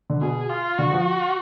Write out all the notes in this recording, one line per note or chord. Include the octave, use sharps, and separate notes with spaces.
D3
B2 G#4
F4
D3 F#4
F3